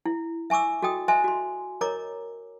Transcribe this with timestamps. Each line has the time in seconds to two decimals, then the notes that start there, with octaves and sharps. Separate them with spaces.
0.06 E4
0.50 E5 G#5 C#6 D6 E6
0.82 F#4 A4 D#5 G5 D#6
1.08 C5 D#5 E5 G#5 C6
1.24 F#4 C6
1.81 A#4 C#5 D#5 A#5 D6